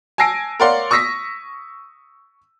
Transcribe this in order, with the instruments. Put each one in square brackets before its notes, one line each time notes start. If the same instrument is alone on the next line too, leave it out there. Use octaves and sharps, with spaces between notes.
[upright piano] G#5 A5 E6 A#6 C7 D7
A#4 C#5 D5 F5 F#5 C6
C#6 D#6 E6 A#6 B6